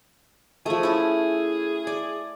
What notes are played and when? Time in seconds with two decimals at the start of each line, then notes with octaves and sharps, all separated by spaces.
0.66 F3 A3 G#4
0.83 C#4 E4
1.87 D5